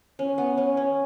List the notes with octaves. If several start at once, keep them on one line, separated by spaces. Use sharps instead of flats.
C#4
B3
C#4
C#4